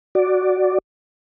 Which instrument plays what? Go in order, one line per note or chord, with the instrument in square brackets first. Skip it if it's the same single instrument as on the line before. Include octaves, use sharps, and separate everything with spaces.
[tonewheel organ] F#4 D5